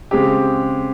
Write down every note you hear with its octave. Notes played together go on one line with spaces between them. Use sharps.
C#3 G#3 C4 G4